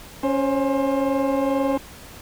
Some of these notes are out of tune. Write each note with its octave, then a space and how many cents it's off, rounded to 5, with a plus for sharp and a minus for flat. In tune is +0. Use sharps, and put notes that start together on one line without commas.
C#4 -5 C5 +25